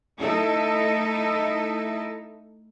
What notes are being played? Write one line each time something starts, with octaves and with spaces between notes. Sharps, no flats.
A3 D#4 E4 A4